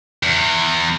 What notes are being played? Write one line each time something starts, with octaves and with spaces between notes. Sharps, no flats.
E2